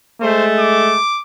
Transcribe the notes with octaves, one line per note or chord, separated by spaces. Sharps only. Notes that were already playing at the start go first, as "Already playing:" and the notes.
G#3 A3 C5
D6